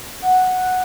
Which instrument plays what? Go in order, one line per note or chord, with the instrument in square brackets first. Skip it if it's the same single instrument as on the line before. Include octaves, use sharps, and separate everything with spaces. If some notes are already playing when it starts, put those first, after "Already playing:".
[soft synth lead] F#5